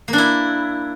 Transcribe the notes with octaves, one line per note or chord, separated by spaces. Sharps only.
A#3
D4
E4